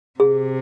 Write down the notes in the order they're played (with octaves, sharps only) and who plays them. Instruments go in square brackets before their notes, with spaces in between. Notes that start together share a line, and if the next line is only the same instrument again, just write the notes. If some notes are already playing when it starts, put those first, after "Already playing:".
[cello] C3 [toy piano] G#4